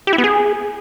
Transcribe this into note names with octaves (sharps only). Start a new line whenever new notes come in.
G4
E4
B3
G#4